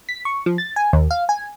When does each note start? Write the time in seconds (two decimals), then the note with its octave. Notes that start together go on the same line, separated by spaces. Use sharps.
0.09 B6
0.25 C#6
0.46 F3
0.58 A6
0.76 G#5
0.93 D#2
1.11 F5
1.29 G#5